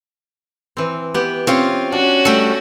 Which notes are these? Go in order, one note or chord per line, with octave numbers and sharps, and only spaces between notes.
E3 C4
B3 G4
C4 C#4 F4 C#5
C#4 D4 F#4
G3 A3 A4 G5